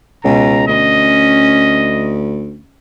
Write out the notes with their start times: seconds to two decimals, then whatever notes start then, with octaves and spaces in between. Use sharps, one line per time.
0.24 C#2 B2 A#5
0.68 D2 C#4 D#5